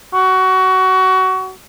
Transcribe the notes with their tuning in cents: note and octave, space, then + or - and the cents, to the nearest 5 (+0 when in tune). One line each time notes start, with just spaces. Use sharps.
F#4 +20